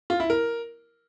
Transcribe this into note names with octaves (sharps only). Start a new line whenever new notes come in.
F4
E4
A#4